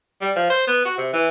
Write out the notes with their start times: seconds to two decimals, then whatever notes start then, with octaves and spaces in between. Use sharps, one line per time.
0.21 G3
0.36 F3
0.50 C5
0.67 B3
0.85 F#4
0.98 C3
1.13 E3